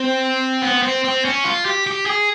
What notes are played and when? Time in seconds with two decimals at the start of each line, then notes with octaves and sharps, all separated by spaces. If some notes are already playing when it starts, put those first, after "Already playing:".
Already playing: C4
0.62 B3
0.83 C4
1.04 C4
1.25 C#4
1.44 F4
1.66 G4
1.87 G4
2.06 G#4